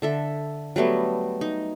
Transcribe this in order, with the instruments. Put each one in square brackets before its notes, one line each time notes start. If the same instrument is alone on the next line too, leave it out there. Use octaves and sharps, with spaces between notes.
[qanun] D3 A4 E5
F#3 G3 A3 B3
D#4